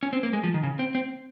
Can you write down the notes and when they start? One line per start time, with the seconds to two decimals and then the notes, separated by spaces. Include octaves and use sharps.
0.03 C#4
0.13 C4
0.23 A#3
0.33 G#3
0.43 F3
0.54 D#3
0.63 C#3
0.79 C4
0.95 C4